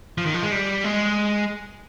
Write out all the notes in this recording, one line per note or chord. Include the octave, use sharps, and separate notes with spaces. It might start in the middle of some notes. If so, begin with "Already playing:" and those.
F3
D#3
F3
G#3
G3
G#3